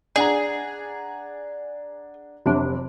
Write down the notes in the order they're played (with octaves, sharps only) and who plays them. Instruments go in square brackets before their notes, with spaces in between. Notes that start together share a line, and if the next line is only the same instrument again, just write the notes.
[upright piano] D4 F#5 A#5 [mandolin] G#4
[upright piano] F1 [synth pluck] C3 F#3 D4